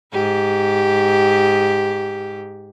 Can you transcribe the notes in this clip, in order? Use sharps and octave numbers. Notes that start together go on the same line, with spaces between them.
G#2 G4